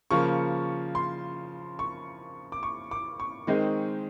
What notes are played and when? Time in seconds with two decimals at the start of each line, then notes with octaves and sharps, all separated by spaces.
0.11 C#3 F3 A#3 C#6
0.95 C6
1.79 C#6
2.52 D6
2.63 C#6
2.91 D6
3.20 C#6
3.47 D#3 G#3 C4 D#4